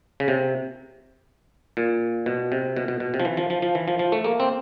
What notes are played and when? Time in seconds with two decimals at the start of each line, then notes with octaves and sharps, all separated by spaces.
0.20 C#3
0.28 C3
1.77 A#2
2.26 B2
2.52 C3
2.77 B2
2.88 B2
3.00 B2
3.14 C3
3.20 F3
3.25 E3
3.37 F3
3.50 F3
3.62 F3
3.75 E3
3.88 F3
3.99 F3
4.12 A3
4.24 A#3
4.40 C4